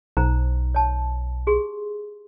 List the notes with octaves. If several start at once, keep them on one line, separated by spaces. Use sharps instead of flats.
B1 D#4 C5 A#5
C#5 A5
G4 G#4 C6